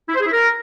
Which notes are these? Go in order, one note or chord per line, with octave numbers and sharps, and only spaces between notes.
E4
C5
G#4
E4
A#4